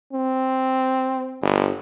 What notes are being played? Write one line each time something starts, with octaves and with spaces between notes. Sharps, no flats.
C4
G1